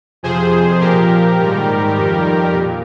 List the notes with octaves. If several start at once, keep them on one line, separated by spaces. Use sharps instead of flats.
F2 C3 F3 G#4 C5
A#2 F3 G4 A#4
G#2 D#3 G3
F2 D#3 G3
A#2